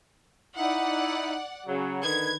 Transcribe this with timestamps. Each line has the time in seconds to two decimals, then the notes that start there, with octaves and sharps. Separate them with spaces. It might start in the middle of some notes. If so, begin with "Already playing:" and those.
0.57 D#4 E4 D5 F#5
1.67 C#3 F#3
2.03 D3 D#3 B4 G#6